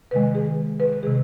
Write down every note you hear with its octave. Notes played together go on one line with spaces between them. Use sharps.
C3 D#3 G#3 B4
G#4
B4
B4
C3 D#3 G#3 G#4